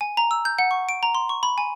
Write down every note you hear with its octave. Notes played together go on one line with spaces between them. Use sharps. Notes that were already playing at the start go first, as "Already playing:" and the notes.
G#5
A#5
E6
G6
F#5
C#6
D7
A#5
C6
C#6
B5
G#5